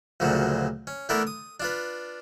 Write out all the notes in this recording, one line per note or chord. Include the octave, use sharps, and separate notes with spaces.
D2 A#2 C#3 F3 F#3
C#4
E3 A3 B3 D4 A#4
D#6
D4 F4 B4